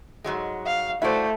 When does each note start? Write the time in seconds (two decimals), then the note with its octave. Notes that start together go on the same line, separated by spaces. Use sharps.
0.24 G#2 F#3 G#3
0.66 F5
1.02 A3 E4 F#4 C5 D5